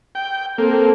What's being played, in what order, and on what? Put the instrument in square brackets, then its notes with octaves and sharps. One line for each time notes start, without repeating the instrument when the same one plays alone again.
[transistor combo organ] G5
[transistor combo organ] A#3 [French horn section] C4 A4